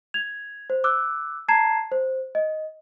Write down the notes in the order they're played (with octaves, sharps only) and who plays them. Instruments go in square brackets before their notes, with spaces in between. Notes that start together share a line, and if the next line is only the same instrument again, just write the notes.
[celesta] G#6 F7
C5
D6 E6 F#6
A5 A#5 G#6 C7 E7
C5
D#5